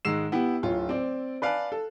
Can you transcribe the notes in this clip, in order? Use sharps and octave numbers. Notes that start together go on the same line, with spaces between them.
G#2 D#3 G#3 E6 C7 E7
B3 E4 G4
D1 F4 C#5
C4 D5
B4 D5 F5 G#5 A5 F#6
A4